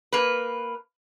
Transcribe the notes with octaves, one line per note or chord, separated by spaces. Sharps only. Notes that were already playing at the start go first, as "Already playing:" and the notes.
A#3 B4